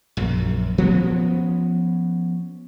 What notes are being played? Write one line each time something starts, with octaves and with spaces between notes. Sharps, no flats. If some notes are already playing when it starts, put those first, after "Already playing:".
A#1 F#2
F3 B3 C#4